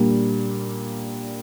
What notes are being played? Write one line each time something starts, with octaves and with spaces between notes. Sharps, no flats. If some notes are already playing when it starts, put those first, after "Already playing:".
Already playing: A#2 G3 A#3 D4